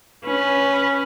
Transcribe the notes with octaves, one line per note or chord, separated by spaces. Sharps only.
C#4 B4